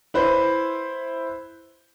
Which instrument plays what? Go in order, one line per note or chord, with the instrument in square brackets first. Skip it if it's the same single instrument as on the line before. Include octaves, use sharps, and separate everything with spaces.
[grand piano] E4 B4 C5